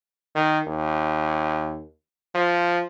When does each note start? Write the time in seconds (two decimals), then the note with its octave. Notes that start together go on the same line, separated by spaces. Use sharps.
0.35 D#3
0.67 D#2
2.35 F3